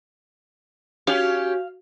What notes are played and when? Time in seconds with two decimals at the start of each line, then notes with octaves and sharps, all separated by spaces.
1.07 C#4 F#4 G4 F5